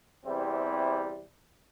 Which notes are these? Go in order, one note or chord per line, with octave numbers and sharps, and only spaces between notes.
E2 C3 G3 C4 E4